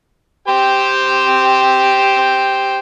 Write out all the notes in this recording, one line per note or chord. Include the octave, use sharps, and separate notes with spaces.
G4 C5 G5